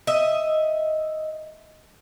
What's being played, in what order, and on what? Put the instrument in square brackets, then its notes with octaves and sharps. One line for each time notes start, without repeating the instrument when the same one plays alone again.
[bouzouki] D#5 E5